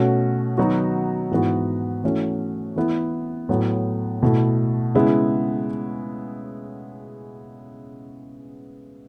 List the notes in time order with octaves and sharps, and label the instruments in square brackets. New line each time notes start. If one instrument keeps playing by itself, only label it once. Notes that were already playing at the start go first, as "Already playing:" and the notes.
Already playing: [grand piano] B2 A3 C#4 F#4
D#3 F#3 B3 D#4 F#4
G#2 E3 B3 F#4
E3 A3 C#4 F#4
E3 B3 E4
A2 F#3 B3
B2 A3 E4
C#3 G#3 B3 E4